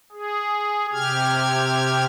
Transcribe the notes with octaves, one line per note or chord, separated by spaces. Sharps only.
G#4
C3 G4 F6 G#6